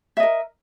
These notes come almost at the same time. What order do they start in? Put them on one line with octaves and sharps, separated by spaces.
E5 D#5 A#4